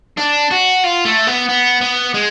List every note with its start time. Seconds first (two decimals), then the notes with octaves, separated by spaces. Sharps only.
0.18 D4
0.51 F#4
0.84 F4
1.05 A3
1.27 B3
1.49 B3
1.81 B3
2.14 G#3